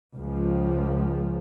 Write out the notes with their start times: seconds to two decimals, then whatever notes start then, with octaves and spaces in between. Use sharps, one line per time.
0.15 C#2 F3